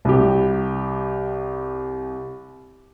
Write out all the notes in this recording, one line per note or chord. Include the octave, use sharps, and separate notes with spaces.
C2 G4